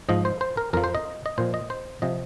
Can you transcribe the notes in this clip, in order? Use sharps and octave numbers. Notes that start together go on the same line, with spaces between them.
G#2 F3 D#5
C5
C5
A#4
F2 F3 A#4
C5
D#5
D#5
A#2 F3 C5
D#5
C5
C3 F3 D#5